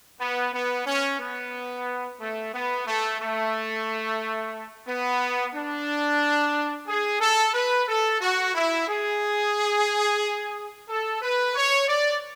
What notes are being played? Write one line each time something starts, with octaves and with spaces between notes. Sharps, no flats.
B3
B3
C#4
B3
A3
B3
A3
A3
B3
D4
G#4
A4
B4
A4
F#4
E4
G#4
A4
B4
C#5
D5